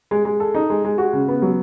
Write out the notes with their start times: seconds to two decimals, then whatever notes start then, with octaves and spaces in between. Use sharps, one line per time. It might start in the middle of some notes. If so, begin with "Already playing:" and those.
0.11 G#3
0.25 G#3
0.40 A4
0.54 D#4
0.70 G#3
0.84 G#3
0.98 F#4
1.13 C#3
1.28 B3
1.42 F#3